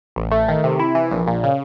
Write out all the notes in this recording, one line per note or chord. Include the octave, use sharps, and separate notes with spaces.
A1
A3
D#3
C3
E4
E3
A#1
A#2
C#3